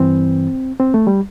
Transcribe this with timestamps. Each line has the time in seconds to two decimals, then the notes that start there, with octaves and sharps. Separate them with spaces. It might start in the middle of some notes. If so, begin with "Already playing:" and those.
Already playing: G2 E3 C4
0.80 C4
0.94 A3
1.07 G3